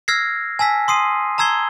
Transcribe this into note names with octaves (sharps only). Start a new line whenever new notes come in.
E6 F6 G#6 A#6 C7
G#5 A5 E6 B6
C6 D#6 C7 D#7
A5 A#5 E6 G#6 C7 G7